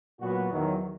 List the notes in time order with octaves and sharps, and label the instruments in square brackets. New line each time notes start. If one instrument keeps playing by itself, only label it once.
[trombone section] A#2 F#3 B3 F#4
E2 D#3 F#3